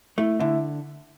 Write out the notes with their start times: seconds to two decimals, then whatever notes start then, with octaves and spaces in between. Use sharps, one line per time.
0.18 A3 E4 E5
0.40 D3 E4 E5